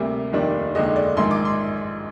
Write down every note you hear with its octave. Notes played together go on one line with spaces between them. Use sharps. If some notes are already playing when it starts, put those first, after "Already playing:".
Already playing: D2 C3 G3 A#3
F1 D#2 D#3 G3 D4
F1 D#2 D3 G#3 D#5
D5
A#1 G#2 D#3 C6
D6
C6